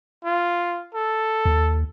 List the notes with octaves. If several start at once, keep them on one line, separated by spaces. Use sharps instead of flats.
F4
A4
D#2